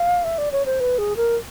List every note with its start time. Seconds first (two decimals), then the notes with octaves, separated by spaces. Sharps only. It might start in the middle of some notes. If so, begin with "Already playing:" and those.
Already playing: F5
0.24 E5
0.38 D5
0.52 C#5
0.66 C5
0.80 B4
0.98 G#4
1.17 A#4